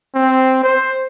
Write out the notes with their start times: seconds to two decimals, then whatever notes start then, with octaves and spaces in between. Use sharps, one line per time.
0.15 C4
0.63 C5